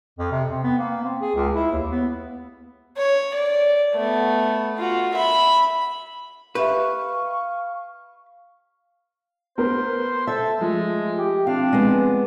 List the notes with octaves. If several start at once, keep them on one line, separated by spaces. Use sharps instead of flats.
F2
C3
C4
B3
A#3
C4
G#4
C#2
E4
D#2
B3
C#5
D5
A3 B3
F4 F#4
E5 B5
G4 B4 E5 F5 C#6
B3 A#4 C5
A4 E5
F3 G#3 A3
G4
C4 D4 F5
G#3 B3